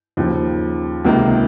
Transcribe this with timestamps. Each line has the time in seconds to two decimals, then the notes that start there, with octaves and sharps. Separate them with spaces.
0.17 D#2 C#3 F3
1.04 C#2 C3 D#3 A#3 F4